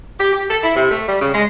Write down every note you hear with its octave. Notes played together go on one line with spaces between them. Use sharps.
G4
G4
A4
E4
C3
A3
G3
C#3
G#3